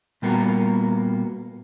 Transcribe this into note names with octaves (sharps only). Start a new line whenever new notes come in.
A#2 G3 A#3 B3 F#4 A#4